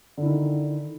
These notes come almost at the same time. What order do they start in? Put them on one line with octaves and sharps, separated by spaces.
D3 E4 D#3